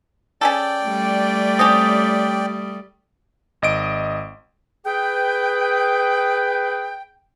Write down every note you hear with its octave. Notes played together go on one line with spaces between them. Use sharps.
C#4 G#4 A4 D5 G5
G3 A3
C4 C#4 G4 D#6
G#1 D#5 D7
G#4 B4 G5